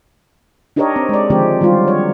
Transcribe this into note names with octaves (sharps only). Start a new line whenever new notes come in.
D4 D#4 G4 A#4 C#5 D#5
C4
G#3 D5
D3 D#3 F3 G#3 C4 G4
D#3 F#3 G3 F4
C#5